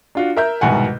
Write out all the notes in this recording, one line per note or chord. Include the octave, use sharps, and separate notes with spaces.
D4 F4 F#4
A#4 E5 G6
C2 G#2 B2 D#3 F#5 G#5